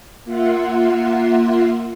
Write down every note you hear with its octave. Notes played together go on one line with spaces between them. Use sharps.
A#3 F4 E5 F#5 C6